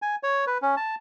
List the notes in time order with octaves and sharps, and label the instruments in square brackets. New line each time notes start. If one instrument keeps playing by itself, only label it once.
[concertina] G#5
C#5
B4
C#4
A5